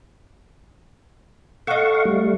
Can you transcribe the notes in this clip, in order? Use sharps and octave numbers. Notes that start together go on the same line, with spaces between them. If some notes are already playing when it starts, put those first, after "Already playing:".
A4 D#5 F5 F#5 C#6
G3 A3